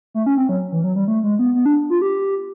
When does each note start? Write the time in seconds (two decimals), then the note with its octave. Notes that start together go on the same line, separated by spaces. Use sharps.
0.15 A3
0.26 C#4
0.37 C4
0.49 F#3
0.72 E3
0.84 F#3
0.96 G3
1.08 A3
1.24 G#3
1.39 B3
1.55 B3
1.66 D4
1.90 F4
2.02 G4